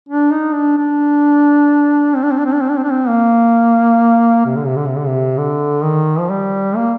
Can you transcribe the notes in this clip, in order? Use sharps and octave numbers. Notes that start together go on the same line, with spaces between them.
D4
D#4
D4
D4
C4
D4
C4
D4
C4
D4
C4
D4
C4
D4
C4
A#3
C3
D3
C3
D3
C3
D3
C3
D3
D#3
F3
G3
A#3